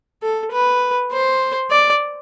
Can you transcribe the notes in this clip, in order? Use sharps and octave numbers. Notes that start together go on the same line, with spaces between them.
A4
B4
C5
D5